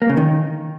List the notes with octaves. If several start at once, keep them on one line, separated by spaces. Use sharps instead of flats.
A#3
C#3
D#3